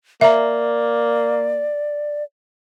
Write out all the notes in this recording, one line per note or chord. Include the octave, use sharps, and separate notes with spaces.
A#3 D5 E5 A#5